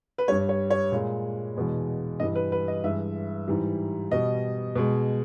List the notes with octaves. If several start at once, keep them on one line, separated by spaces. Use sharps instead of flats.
B4
G2 G3 C#5
C#5
C#5
A#2 G#3
E2 B2 G#3
G2 E3 G3 D#5
B4
B4
D#5
G2 E3 G#3 E5
G#2 E3 G3
B2 G3 D#5
B2 G#3